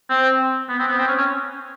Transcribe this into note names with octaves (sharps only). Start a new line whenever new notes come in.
C4
B3
C4
B3
C4
C#4
C#4